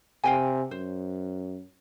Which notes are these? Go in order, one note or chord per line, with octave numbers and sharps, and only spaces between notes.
C3 F5 G5 G#5
F#2 C5